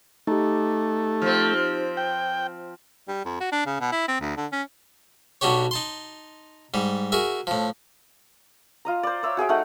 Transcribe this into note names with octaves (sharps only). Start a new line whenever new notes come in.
A3 D#4 G4
F3 C4
G5
G3
F2
F#4
D4
C#3
B2
E4
C4
D2
D3
C#4
B1 B2 D4 F#4 G4 C#5
D#4 A5 C6
G#2 G3
F#4 G#4 A#4 E5
A2 F3
F4 D#5 A#5
C5 D5
C#5 E5 E6
F#4 G#4 E5 G5
A3 D#4 F#5